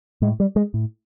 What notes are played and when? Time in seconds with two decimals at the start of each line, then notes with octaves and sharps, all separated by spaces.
0.22 A2 G#3
0.40 G3
0.56 G#3
0.74 A2